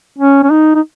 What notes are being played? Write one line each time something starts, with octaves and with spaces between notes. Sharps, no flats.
C#4
C#4
D#4
D#4